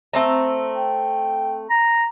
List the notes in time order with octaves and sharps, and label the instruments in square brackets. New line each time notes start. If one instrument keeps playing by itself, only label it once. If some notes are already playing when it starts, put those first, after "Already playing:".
[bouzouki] A3 C4 A#5
[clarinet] G5
A#5